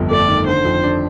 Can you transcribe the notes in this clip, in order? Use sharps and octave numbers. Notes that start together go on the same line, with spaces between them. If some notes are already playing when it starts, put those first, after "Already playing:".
Already playing: G1 F2
A3 D5
D#3
D3 C5
F2
D4